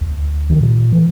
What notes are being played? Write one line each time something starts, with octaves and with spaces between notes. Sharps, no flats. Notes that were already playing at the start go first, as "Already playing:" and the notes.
D2
D#3
A#2
E3